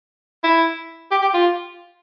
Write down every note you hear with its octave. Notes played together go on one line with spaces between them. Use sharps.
E4
G4
G4
F4